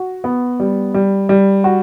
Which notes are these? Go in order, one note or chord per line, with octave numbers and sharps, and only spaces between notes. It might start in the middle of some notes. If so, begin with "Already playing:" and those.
Already playing: F#4
B3
G3
G3
G3
F#4